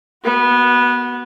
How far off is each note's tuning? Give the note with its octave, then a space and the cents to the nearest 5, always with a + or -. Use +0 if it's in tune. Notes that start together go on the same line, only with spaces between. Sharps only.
B3 -15 F#4 +20